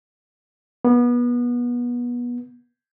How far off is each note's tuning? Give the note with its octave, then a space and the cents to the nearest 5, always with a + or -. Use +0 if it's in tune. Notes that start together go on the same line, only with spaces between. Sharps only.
B3 -25